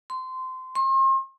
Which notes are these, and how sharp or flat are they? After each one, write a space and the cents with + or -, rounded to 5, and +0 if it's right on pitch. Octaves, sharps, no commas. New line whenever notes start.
C6 -20
C6 +40